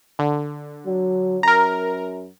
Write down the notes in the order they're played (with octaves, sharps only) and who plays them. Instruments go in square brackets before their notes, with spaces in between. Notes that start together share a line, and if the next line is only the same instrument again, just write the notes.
[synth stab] D3
[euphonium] F#3
[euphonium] F#2 [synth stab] A#4 A#5